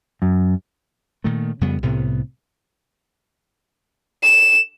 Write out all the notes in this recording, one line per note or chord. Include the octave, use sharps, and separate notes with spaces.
F#2
A#2 D#3 A3
F2 C#3 G3 B3
C2 A2 C3 B3
E7